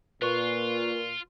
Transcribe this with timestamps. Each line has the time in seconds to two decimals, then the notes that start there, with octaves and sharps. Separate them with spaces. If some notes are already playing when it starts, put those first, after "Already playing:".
0.22 A#2 F4 B4 C#6